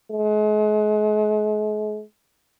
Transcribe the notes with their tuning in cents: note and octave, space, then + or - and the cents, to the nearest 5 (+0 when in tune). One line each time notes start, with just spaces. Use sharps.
G#3 +40